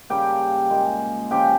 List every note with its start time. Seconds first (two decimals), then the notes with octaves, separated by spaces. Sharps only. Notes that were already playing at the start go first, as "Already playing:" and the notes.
0.10 C#3 G3 A#3 G4 G5
0.70 A#2 G#3
1.31 C#3 F3 G#3 G4 G5